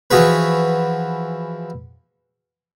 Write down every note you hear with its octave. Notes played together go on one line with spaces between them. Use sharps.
E3 F3 F#4 G#4 B4